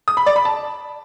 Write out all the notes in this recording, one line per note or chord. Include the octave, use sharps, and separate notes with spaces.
D#6
B5
D5
B5
A5